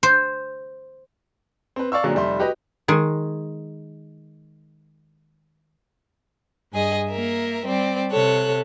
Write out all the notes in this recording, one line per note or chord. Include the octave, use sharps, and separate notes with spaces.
C5
C4 B4
D5 F5 C#6 E6
A#2 D3 F#3 G#3
F1 G3 E5 C6
F#4 G4 B4 D#5
D#3 G#3
G2 G#4 D#5
A#3 A#4 E5
G3 C4 D5
C3 A4 C#5 F#6